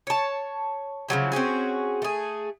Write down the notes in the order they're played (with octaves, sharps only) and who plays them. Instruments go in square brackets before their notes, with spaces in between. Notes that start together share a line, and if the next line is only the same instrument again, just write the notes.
[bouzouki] C#5 A5
C#3 F3 F#3 E4
C4 C#4 F#4 G#4
A3 G#4